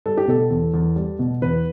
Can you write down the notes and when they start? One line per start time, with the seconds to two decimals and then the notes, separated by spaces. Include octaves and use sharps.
0.06 G3 A4
0.17 G4
0.28 B2 A4
0.50 E2
0.74 E2
0.96 G3
1.19 B2
1.42 E2 B4